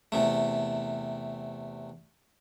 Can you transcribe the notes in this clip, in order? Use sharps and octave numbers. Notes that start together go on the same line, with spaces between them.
E2 C3 A3